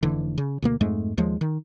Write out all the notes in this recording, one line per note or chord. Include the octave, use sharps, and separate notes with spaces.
F1 D3 E3
C#3
D2 B2 A#3
F2 G#2 G#3 A3
D#2 F3 G#3
D#3